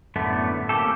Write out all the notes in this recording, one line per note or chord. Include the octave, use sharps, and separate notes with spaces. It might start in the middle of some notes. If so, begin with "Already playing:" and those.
F#2 A2 D3 A3 B3
A#3 C4 C#4 G4 A4